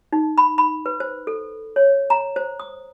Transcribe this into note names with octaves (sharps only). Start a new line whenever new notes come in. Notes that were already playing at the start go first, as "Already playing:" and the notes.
D#4
B5
B5
B4
C5
A4
C#5
A#5
C5
D#6